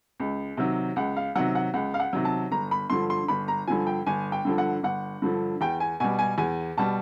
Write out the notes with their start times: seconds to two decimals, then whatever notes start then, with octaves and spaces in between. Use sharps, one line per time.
0.20 C#2
0.57 C3 D#3 F#3
0.96 C#2 F#5
1.17 F5
1.36 C3 D#3 F#3 F#5
1.55 F#5
1.74 C#2 F#5
1.94 F5
2.00 F#5
2.13 C3 D#3 F#3
2.25 A5
2.51 G1 A#5
2.71 B5
2.90 G2 D3 F3 C6
3.10 C6
3.28 G1 B5
3.48 A#5
3.67 G2 D3 F3 G#5
3.87 G5
4.06 G1 G#5
4.32 G5
4.45 G2 D3 F3
4.58 F#5
4.83 G1 F#5
5.22 G2 D3 F3
5.61 E2 G5
5.80 G#5
6.00 B2 G3 G#5
6.19 G#5
6.38 E2 G#5
6.77 B2 G3 A5